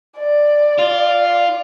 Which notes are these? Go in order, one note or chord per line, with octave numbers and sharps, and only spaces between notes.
D5
F4